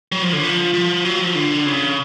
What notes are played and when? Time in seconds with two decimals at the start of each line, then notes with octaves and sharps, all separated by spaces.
0.12 F#3
0.22 F3
0.33 D3
0.43 F3
0.74 F3
1.05 F#3
1.20 F3
1.35 D3
1.66 C#3